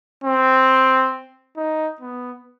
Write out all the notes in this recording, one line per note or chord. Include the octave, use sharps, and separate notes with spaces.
C4
D#4
B3